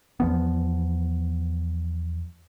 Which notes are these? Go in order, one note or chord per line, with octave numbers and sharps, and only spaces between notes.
E2 F3 B3